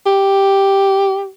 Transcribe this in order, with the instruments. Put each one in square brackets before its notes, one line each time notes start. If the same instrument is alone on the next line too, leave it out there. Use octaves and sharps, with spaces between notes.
[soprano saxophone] G4